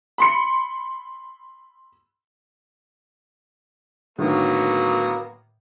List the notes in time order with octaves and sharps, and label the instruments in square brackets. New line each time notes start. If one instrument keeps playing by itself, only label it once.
[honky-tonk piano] B5 C6 C#7
[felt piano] A2 D3 D#3 [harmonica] F#3 A#3 B3